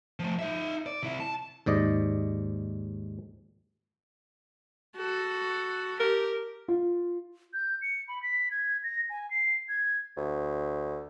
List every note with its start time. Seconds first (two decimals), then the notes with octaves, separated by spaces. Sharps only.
0.20 F3 A3
0.39 D#4 E5
0.86 D5
1.03 C3 E4
1.20 A5
1.66 D#2 G#2 D5 D#5
4.96 F#4 A4
6.00 G4 A#4
6.68 F4
7.53 G6
7.82 C#7
8.08 B5
8.23 B6
8.51 G#6
8.84 A#6
9.10 G#5
9.31 C7
9.69 G#6
10.17 D2